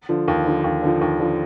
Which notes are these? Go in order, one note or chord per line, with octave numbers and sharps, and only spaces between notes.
D3 F3
D#2
D3 F3
D#2
D3 F3
D#2
D3 F3